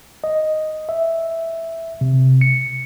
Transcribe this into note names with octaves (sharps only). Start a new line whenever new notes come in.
D#5
E5
C3
C#7